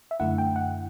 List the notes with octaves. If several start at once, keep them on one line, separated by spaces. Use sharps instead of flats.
E5
F#2 D3 A3 E4 F#5
G5
F#5